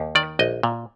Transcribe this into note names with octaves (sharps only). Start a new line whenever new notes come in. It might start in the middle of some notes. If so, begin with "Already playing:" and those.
Already playing: D#2
D#3 D5
A#1 D#5
A#2